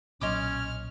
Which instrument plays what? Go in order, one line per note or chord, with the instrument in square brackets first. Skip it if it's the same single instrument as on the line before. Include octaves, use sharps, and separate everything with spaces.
[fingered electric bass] B1 A#2 F#3 [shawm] C#4 [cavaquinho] D#5 C6 D6 [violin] F6